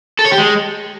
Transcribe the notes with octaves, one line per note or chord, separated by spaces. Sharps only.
A4
C#5
G4
G#3